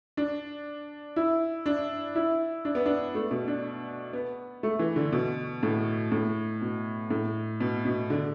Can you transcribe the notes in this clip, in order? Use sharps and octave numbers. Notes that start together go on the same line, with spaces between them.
D4
E4
D4
E4
D4
B3
D4
A3
B2
D4
B3
A3
E3
D3
B2
A2
A2
B2
A2
B2
B2
D3